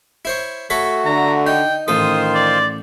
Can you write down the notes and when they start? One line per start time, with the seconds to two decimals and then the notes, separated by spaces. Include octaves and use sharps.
0.25 E4 C5 C#5
0.70 A3 F#4 A4 C#5 B5
1.06 D3 A#5
1.47 D#4 G5
1.88 A1 D#3 F4 A4 C5 C6 D#6
2.35 D5